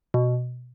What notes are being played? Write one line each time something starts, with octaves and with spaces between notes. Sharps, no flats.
B2